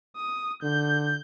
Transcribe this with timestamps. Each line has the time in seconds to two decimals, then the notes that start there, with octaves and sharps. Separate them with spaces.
0.17 D#6
0.63 D3 G6